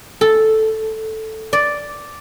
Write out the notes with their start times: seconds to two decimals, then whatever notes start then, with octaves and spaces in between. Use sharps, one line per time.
0.21 A4
1.53 D5